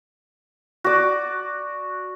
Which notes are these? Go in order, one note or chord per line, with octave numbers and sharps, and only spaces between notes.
F#4 D5